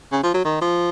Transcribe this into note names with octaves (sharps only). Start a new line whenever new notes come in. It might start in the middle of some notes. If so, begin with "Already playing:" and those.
C#3
F3
F#3
D#3
F3